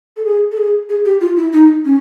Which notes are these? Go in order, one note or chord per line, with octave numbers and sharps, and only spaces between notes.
A4
G#4
A4
G#4
G#4
G4
F4
E4
D#4
C#4